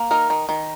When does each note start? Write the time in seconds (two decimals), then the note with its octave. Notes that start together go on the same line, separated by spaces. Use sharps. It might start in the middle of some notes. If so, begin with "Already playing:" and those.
Already playing: A#3
0.11 D#4 A#4
0.30 D#3
0.49 D#3